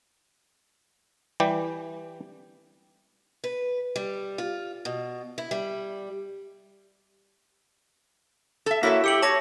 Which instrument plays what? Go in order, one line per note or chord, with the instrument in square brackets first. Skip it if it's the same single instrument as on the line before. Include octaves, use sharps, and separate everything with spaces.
[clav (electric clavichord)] E3 G3 G4
[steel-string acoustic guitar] B4
G3
F4
B2
E4
G3
[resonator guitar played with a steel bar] A4 E5
[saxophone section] A#3 F#4 C#5 [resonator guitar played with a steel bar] E4 A4 E5 [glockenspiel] B6
[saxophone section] G4 [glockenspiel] E6 C#7 F#7
[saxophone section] C#5 [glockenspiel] A5 D6 A#6